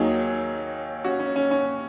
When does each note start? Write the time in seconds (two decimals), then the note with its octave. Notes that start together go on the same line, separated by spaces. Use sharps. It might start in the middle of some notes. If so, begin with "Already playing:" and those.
Already playing: D#2 D#3 F#3 D#4 G#4
1.05 C#4 F#4
1.20 C#4
1.36 C#4
1.51 C#4